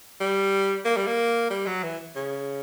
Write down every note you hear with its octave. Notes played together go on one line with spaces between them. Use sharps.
G3
A#3
G3
A#3
G3
F#3
E3
C#3